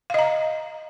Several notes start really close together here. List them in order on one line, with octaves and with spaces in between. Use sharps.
F5 D#5 A#5